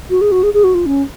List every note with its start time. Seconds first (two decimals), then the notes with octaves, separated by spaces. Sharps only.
0.10 F#4
0.21 G#4
0.32 F#4
0.43 G#4
0.54 G#4
0.64 F#4
0.74 F4
0.86 C#4